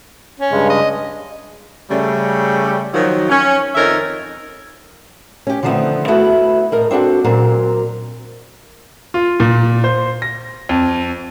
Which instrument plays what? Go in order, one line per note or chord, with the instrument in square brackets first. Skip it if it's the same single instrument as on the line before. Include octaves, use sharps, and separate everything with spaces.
[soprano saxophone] C#4
[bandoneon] G2 C#3 G#3
[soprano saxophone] D#5
[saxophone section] C#3 G3 A3
D#3 F3 F#3
C#4
F2 D#3 D#4 A#4 C#5 E5
[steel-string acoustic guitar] C#4 G4
D3 D#3 F3 A3 B3 C4
A3 B3 E4 F#4 A4 B4
A2 A#4 D#5
C4 D4 F#4 A4
A#2 F#3 C4 A#4
[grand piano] F4
A#2
C5
A#6
F2